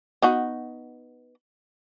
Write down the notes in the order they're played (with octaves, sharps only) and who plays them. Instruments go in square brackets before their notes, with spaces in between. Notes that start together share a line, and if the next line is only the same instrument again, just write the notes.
[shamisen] B3 D#4 F#4